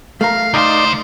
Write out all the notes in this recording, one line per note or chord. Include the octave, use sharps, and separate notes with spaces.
A3 A#4 F5
C#2 D#4 C5 D5